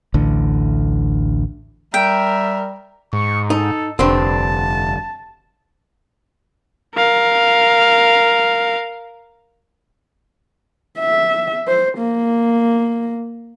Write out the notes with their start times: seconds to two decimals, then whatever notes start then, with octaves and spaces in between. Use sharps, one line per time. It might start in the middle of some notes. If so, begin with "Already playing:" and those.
0.14 A1 D2 D3
1.94 G3 A#4 E5 G5
3.13 G#2 C#6
3.50 D#4 A4
3.99 F1 G2 D3 C4 A5
6.95 A#4 F5
10.99 E5
11.68 C5
11.98 A#3